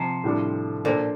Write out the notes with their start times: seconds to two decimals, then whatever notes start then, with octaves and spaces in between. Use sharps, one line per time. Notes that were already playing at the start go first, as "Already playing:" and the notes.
Already playing: C3 F3
0.24 A2 G3 D4
0.84 A#2 A#3 D4 A4 C5